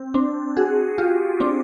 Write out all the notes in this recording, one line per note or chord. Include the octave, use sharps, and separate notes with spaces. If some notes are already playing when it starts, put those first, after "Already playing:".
Already playing: C4
C4 D4
F#4 G#4
F4 G4
C4 D4